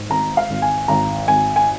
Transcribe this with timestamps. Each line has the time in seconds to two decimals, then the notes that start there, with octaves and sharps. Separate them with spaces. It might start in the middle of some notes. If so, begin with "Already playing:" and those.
Already playing: G#2
0.10 G#1 A#5
0.37 F5
0.50 G#1
0.62 G#5
0.88 G#1 A#5
1.28 G#1 G#5
1.56 G#5